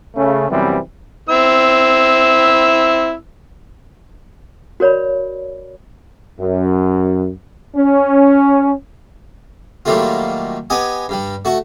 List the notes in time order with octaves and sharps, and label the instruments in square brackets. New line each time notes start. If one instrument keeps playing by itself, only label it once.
[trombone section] C#3 A3
F#2 C3 E3 G3 B3 C4
[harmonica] C4 E4 E6
[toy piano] F#4 A#4 C#5 D5 B5
[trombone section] F#2
C#4
[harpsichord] A#2 D#3 F#3 G3 A3 F4
B3 G4 D#5 G#5
G2 G3
A3 F#4